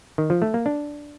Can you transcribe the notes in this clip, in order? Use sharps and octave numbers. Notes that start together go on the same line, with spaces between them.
D#3
F3
A3
A#3
D4